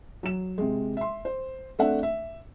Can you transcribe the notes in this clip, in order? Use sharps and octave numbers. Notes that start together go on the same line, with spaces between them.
F#3 E7
C3 G#3
E5 C6
C5
A3 C4 D4 E5 F#5
E5